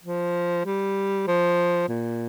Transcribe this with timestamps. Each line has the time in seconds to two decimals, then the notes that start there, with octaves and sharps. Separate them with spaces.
0.03 F3
0.66 G3
1.27 F3
1.88 A#2